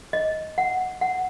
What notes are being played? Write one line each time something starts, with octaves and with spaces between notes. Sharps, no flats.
D#5
F#5
F#5